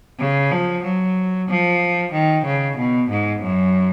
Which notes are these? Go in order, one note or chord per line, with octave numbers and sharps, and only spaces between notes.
C#3
F3
F#3
F3
D#3
C#3
B2
G#2
F#2